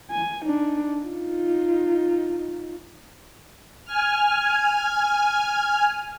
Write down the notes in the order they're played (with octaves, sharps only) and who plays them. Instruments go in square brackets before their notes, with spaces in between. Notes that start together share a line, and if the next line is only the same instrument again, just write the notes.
[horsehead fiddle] G#5
D4 D#4
D#4 F4
[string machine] G#5 F6